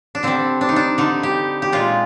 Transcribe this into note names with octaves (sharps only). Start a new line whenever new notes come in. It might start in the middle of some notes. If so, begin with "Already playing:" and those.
D4
D3 G3 C4
D4
D#4
D4
D3 G3 D#4
G4
G4
A#2 G#3 F4